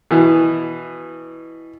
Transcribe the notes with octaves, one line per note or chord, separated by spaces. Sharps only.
B2 E3